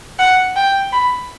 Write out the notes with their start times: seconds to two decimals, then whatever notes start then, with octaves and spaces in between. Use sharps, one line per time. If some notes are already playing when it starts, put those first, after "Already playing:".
0.19 F#5
0.56 G5
0.93 B5